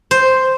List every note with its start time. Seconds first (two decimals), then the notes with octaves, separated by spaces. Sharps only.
0.11 C5